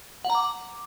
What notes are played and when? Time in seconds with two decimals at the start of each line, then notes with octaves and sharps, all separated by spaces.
0.25 F#5
0.30 A#5
0.35 D6